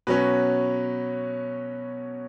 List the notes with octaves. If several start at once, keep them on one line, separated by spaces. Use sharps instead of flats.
B2 F#3 C#4 B4